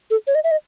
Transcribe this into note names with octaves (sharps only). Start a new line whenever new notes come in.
A4
C#5
D#5
E5
D#5